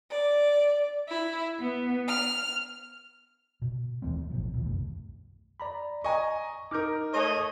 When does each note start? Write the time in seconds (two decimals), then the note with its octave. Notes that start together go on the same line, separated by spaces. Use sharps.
0.12 D5
1.09 E4
1.59 B3
2.08 F6
3.62 B2
4.02 D#2 E3 A3 C4
4.30 A1 B2 F3
4.54 A#1 D#2 B2 E3
4.65 C2 F#2 A3
5.60 D5 A#5 B5
6.04 D#5 G#5 A#5 C#6
6.71 D#4 A#4 D6 F6 G6
7.13 A3 C#5 D#5